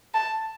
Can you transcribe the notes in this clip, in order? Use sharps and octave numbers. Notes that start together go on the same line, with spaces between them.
A5